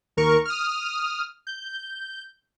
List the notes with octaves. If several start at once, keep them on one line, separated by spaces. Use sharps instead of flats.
D#2 A#4 C#6
D#6 F6
G6